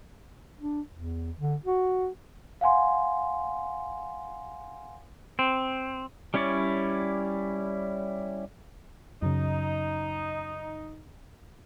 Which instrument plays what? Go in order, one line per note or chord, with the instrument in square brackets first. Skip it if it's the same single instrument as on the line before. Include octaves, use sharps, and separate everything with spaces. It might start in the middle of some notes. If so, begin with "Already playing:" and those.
[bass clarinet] D4
E2
D3
F#4
[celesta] F5 F#5 G#5 C6
[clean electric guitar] C4
[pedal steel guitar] G3 C#4 E4 C#5 D5
[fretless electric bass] F#2 C#3 [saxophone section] D#4